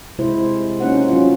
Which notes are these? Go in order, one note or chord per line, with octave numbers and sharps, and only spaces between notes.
C3 G#3 E4 C5
A#3 C#4 D#4 C5 F#5
F#3 C#4 F4